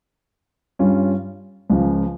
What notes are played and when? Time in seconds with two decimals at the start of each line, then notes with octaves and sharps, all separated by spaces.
0.79 G2 G3 C#4 F4
1.70 C#2 C#3 F3